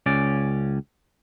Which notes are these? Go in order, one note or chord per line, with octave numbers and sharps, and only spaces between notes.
C#2 C#4 D5